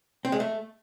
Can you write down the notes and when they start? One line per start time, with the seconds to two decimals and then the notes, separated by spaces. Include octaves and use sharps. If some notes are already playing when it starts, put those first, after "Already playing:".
0.25 C4
0.32 G#3
0.40 A3